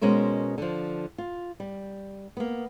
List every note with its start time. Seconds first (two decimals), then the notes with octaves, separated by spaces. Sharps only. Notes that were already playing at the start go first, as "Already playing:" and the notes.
0.01 B2 G#3 C#4 A#4 C5
0.58 D3 F3
1.18 F4
1.60 G3
2.37 A#3 B3